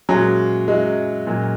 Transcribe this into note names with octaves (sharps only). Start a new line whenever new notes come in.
A#2 F#3 G#3 C#4 E4 G#4
F#3 G#3 C#4 E4
A#2 F#3 C#4